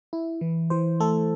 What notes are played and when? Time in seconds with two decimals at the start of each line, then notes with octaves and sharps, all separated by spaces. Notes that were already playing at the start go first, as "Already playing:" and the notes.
0.13 E4
0.41 E3
0.70 E3 C5
1.00 A3 A4